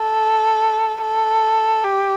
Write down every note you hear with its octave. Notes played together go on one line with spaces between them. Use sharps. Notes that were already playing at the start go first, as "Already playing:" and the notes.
Already playing: A4
A4
G4